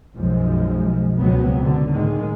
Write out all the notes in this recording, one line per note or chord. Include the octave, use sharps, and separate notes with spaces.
B1 F#2 B2 F3 G#3
C#2 C3 F#3 B3
D3
A2 D#3 G#3